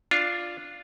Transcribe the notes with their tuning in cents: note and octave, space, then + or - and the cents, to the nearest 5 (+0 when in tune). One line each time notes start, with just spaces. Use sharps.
D4 +0 F4 +0